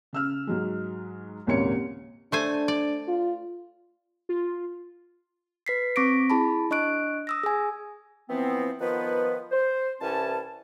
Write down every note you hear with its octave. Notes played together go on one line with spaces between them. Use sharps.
C#3 E6 F6
G#2 F#3 G#3
D#1 G#1 C#3 A#3 C#5 C#7
A3 D4 C5 G#5
D5
F4
F4
B4 B6 C7
C4 C#6 D6 A#6 B6 D7
E4 G#4 A5 B5
D4 D#5 C#6 F#6 D7
D#6 E6 A#6
G#4 G#5
E3 F3 B3 C4
D#3 F3 B3 B4
C5
C2 E3 C#4 A5